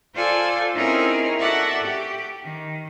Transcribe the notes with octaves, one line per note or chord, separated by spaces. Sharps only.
F4 A4 C5 D5 G#5
C4 C#4 D#4 E4 G#4 A#4
F#4 A4 D5 E5 F#5
G4
D#3